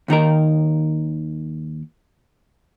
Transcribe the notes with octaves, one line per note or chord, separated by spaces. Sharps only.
D#2 D#3 D#4 A#4